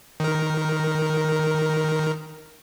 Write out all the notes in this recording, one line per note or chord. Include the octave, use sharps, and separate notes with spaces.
D#3 A#4